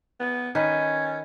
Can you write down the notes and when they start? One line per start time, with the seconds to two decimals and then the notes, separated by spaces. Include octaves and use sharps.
0.20 B3
0.55 D#3 C#4 B4 D#5